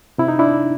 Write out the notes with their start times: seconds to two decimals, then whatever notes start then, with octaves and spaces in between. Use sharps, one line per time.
0.18 C3 E4
0.28 D#4
0.39 D4 E4